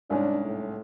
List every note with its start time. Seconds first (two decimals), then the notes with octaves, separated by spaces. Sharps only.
0.10 C2 G#2 C#4 D4
0.44 A2